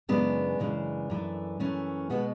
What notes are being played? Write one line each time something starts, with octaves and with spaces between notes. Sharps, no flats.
F#2 C#3 E3 G#3 B3 D4
F#2 C#3 E3 G#3
F#2 E3 A3
F#2 E3 A3 C#4
B2 G#3 B3